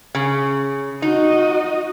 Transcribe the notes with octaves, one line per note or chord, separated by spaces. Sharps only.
C#3
D#4 F#4 D#5